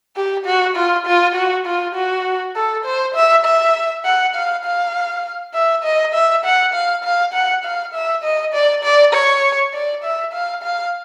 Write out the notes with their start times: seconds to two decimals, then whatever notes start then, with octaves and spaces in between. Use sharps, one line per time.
0.16 G4
0.46 F#4
0.76 F4
1.06 F4
1.36 F#4
1.66 F4
1.95 F#4
2.56 A4
2.85 C5
3.15 E5
3.45 E5
4.05 F#5
4.35 F5
4.65 F5
5.54 E5
5.84 D#5
6.14 E5
6.45 F#5
6.74 F5
7.04 F5
7.33 F#5
7.65 F5
7.94 E5
8.24 D#5
8.54 D5
8.83 D5
9.14 C#5
9.74 D5
10.04 E5
10.33 F5
10.63 F5